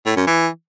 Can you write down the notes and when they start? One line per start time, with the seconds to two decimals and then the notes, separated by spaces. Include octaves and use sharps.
0.06 A2
0.16 F#2
0.27 E3